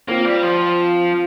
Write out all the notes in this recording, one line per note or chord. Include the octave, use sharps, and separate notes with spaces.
A#3 C4 F4 C5 F5
G3
F3